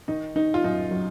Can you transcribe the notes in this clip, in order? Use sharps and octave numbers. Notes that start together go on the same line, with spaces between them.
D#3 D#4
D#3 D#4
F4
F#2 D#4
F#3